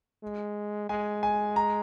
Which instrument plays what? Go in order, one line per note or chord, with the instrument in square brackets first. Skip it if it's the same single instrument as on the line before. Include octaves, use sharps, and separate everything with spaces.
[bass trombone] G#3
[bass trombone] G#3 [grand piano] G#5
[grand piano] G#5
A#5